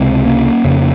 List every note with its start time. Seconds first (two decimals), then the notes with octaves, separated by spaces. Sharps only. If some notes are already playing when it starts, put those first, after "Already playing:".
Already playing: C#2 C3 G#3 C4
0.26 A#3 C#4
0.64 F2 C#3